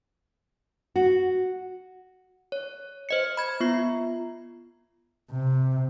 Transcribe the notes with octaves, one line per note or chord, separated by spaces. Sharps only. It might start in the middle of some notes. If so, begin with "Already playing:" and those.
F#4
C#5
C5 D#5 C#7
B5 G#6
B3 F4 C7
C3